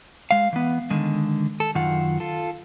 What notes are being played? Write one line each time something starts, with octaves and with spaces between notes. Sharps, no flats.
G#3 F5
E3 B3
D3 D#3 G#3
A4
F#2 D#3 F4 F#5
F4 A4